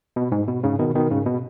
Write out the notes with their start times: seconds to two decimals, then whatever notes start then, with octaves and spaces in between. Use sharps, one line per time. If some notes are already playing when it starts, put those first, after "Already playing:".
0.16 B2
0.32 G#2
0.48 B2
0.63 G#2 C#3
0.79 B2 D#3
0.95 B2 D#3
1.10 G#2 C#3
1.26 B2